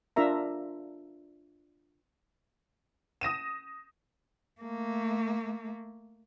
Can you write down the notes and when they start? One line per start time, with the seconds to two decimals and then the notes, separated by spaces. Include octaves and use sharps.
0.16 D4 F4 A#4 E5 A#5
3.21 D#6 A#6 D#7 E7
4.61 A3 A#3